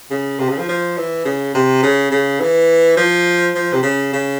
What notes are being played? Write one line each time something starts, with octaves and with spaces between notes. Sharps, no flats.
C#3
C3
C#3
F3
F3
E3
C#3
C3
C#3
C#3
E3
F3
F3
C3
C#3
C#3